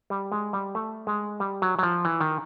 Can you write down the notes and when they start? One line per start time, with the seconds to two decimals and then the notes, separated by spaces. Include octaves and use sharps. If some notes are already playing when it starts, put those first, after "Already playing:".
0.10 G3
0.32 G#3
0.53 G3
0.75 A3
1.07 G#3
1.40 G3
1.62 F#3
1.79 F#3
1.83 F3
2.05 E3
2.21 D#3